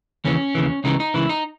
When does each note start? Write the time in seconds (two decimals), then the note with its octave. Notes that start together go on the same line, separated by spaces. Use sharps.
0.25 D#2 C#3 E3 C#4
0.55 D#2 C#3 E3
0.84 C#2 C#3 E3 D#4
1.00 D#4
1.14 C#2 C#3 E3 E4
1.29 D#4